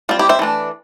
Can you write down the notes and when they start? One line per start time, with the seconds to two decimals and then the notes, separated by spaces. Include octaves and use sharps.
0.09 G3 C4 F4
0.19 E4 G4
0.29 C5 E5
0.39 E3 A3 D4